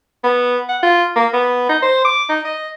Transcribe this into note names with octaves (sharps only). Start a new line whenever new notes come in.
B3
F#5
F4
A#3
B3
D#4
C5
D6
D#4
D#5